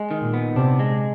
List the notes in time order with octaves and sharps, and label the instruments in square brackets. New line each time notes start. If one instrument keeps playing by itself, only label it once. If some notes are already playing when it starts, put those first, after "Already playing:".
Already playing: [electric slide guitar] G#3
D#3
[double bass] A#2
[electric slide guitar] B3
[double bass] C3 [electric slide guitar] D4
[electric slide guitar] G#3